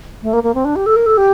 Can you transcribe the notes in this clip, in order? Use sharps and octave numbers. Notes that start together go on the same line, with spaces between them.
A3
A#3
A#3
C4
D4
G4
A4
A#4
A4
G4